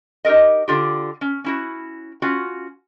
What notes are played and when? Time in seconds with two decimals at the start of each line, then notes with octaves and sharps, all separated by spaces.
0.25 D#4 G4 A4 A#4 D#5
0.68 D3 F4 G4
1.21 C#4
1.44 C#4 E4 F#4
2.22 C#4 F4 F#4